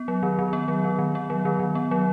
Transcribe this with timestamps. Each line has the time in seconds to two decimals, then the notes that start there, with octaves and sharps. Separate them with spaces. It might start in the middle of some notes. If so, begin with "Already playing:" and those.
Already playing: B3
0.08 F#3
0.23 D#3
0.39 D#3
0.53 B3
0.68 F#3
0.84 D#3
0.99 D#3
1.15 B3
1.30 F#3
1.45 D#3
1.60 D#3
1.75 B3
1.91 F#3